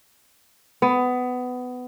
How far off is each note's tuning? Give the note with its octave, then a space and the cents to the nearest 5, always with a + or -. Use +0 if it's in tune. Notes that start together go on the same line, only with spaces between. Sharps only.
B3 +20